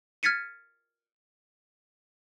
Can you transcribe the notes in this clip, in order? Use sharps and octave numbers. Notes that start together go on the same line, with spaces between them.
F6 G#6 A6 B6 C#7 D#7